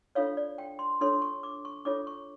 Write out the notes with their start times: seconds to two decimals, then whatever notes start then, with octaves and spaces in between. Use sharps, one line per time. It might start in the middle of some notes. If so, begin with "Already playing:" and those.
0.15 D4 F4 A4 C#5 F5
0.37 D5
0.58 G5
0.79 C6
1.01 D4 F4 A4 C#5 C6
1.22 C#6
1.43 D6
1.65 C#6
1.85 D4 F4 A4 C#5 D6
2.07 C#6